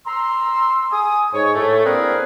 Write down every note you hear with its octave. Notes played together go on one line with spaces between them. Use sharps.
A#5 C6 E6
G#5 D#6
G#2 C#5
A2 A3
A#3 C4 D4 G#4 A#4 B4